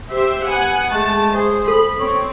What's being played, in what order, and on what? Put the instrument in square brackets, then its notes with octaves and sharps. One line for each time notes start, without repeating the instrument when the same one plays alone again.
[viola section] G4 C5 E5
[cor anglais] B3 [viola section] F#5 G#5
[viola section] G#3 A5 [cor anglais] A3
[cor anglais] G#4 [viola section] C5
[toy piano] A4 [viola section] B5
[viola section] C4 [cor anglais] C#5